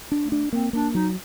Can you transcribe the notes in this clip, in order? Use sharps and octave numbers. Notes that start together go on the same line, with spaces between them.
D4
A3
D4
A#3 C4
A#3 D4
F#3 D#4